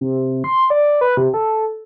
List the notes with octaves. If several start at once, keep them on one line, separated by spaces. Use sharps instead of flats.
C3
C6
D5
B4
C3
A4